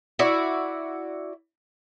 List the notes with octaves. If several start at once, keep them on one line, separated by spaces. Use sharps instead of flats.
E4 F#4 D5